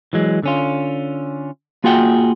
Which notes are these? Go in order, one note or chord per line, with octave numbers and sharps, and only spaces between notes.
E3 F#3 G#3
D3 C#4 F4
A#3 F4 F#4 G#4 F#5 G5